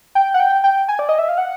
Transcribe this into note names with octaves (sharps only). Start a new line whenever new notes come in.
G5
F#5
G5
G5
G#5
D5
D#5
E5
F5
F#5